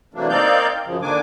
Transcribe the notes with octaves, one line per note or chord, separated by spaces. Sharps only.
C3 E3 F#3 A3 A#3 D4
A#3 C4 D#4 D5 F5 G6
F#2 C#3 F3
D3 D#3 A#3 D4 G#5 D6